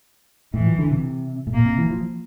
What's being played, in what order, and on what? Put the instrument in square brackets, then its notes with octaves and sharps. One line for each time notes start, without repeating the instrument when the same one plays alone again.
[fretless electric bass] A2 [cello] E3
[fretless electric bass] F3
D3
C3
A2
[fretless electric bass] A#2 [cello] A#3
[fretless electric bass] C3
E3
F3